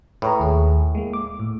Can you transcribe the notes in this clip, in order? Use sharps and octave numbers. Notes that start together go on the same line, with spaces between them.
A2 B4 C#5 A#5
D#2 G#4
G#3 A#3
D6
A2